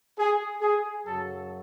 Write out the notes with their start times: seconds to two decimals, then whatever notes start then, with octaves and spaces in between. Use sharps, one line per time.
0.18 G#4
0.61 G#4
1.05 F#2 C#3 F#3 A4